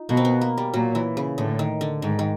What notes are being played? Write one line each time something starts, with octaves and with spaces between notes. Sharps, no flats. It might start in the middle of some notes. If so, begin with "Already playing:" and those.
Already playing: D#4 F4
B2 A#3
C4
B3
A#3
G3
A#2 F#3
E3
C#3
A2 D3
D#3
D3
G#2 D#3
D#3